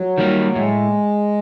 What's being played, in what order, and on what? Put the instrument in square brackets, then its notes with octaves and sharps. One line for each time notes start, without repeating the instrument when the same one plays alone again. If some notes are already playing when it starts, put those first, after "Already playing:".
Already playing: [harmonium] F#3
[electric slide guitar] D#3 G3 A#3
[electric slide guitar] A2 [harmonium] G#3